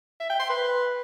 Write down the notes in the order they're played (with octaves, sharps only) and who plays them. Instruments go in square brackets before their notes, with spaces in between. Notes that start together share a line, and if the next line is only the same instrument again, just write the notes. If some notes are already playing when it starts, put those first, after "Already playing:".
[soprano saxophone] E5
G5
C6
B4